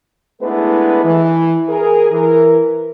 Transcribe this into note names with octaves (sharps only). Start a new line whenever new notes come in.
G#3 A3 B3 D4 E4 B4
E3
G#4 A#4
E3 A#4